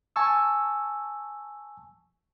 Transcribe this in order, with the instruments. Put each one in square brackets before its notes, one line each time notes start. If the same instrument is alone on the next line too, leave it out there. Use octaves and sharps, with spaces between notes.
[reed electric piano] G#5 A5 C#6 E6